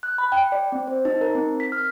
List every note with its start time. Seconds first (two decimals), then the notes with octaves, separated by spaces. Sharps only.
0.03 F#6
0.18 B5
0.32 G5
0.52 D5
0.72 C4
0.87 C5
1.05 D#4
1.21 A#4
1.35 C4
1.60 B6
1.72 F6